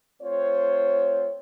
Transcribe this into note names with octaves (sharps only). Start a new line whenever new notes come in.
A3 C4 F4 C5 C#5